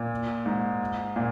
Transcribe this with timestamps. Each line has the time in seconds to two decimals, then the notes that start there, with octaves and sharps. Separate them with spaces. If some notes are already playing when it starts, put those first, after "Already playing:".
Already playing: A#2
0.46 G#2
1.16 A#2